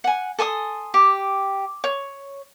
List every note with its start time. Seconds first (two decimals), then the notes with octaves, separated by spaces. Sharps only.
0.04 F#5 G#5
0.39 A4 G#5 C6 D#6
0.94 G4
1.84 C#5